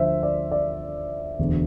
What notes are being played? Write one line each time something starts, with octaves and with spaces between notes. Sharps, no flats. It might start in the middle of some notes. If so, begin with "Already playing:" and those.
Already playing: D2 D3 F3 C5 E5
D5
D5
E1 D2 D3